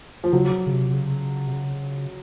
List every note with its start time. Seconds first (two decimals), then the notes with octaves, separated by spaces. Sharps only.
0.24 F3
0.33 C#3 F#3
0.67 C#3
0.73 C3
0.93 C#3
1.47 C3
1.53 C#3